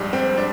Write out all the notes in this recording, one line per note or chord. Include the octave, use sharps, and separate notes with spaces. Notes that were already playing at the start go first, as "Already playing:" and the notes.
Already playing: A#1 G#2 G3
C4
D4